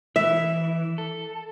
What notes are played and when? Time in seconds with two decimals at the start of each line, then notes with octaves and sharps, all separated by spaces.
0.16 E3 E5
0.98 A4